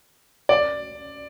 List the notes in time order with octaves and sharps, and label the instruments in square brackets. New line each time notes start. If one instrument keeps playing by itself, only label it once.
[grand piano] D5